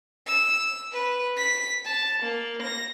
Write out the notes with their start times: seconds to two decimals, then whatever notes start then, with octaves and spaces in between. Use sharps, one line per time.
0.26 E6
0.92 B4
1.37 B6
1.85 A5
2.22 A#3
2.62 A#6